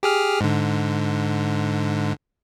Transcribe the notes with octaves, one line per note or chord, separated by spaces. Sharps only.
G4 G#4 F6
G#2 D3